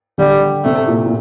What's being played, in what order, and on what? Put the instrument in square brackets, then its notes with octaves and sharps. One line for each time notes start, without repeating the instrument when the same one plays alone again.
[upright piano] D3 [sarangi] G3
[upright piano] C3 [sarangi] A3
[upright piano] A#2
A#2